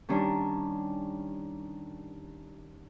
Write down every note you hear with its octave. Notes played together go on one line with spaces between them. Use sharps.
D#3 G3 C#4 D4